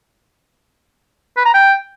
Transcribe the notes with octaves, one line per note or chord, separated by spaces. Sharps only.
B4
A#5
G5